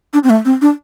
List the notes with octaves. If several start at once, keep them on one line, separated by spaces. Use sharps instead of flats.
D4
C4
A3
C4
D4